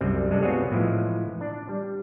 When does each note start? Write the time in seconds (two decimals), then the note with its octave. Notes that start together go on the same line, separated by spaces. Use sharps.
0.01 C2 F#2 G3 C4
0.30 G3 G#3 D4 A4
0.42 B3 C4 F4 F#4 G#4 C#5
0.71 A2 E3 F3 G#3
1.41 D4
1.69 G3